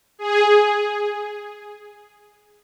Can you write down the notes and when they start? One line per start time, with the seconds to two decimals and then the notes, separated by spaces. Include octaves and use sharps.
0.19 G#4